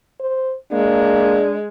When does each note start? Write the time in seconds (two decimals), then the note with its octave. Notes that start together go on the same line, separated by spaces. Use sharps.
0.20 C5
0.72 G#3 A#3 D4